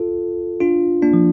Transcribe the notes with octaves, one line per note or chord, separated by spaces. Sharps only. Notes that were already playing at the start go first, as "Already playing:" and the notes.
Already playing: F4 A4
D4 F4
A#3 D4
F3